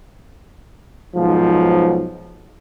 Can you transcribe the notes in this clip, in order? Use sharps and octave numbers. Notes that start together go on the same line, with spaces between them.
B1 G#2 F3